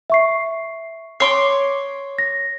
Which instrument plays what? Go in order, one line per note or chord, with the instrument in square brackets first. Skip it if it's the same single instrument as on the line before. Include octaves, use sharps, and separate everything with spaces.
[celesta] E5 C#6 C7
[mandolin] C#5 C6 D6 [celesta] C7
[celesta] A#6